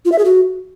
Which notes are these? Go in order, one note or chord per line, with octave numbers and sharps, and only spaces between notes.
F4
E5
G#4
F#4